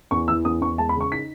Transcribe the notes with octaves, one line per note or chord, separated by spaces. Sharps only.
E2 C#6
E3 E6
E2 D#6
E2 C#6
G#3 A5
B5
C#3
C#6
D#4 B6